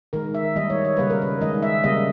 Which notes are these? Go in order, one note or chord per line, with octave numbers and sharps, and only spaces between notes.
D#3 G#3 A#4
E5
D#3 G3 A#3 D#5
C#5
C#5
C#3 G3 A#3 B4
A#4
B4
D#3 G#3 D#5
E5
C#3 G3 A#3 D#5